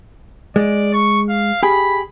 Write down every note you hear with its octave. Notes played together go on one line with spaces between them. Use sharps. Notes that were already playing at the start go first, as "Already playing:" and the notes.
G#3 D5
C#6
F5
G4 G#4 B5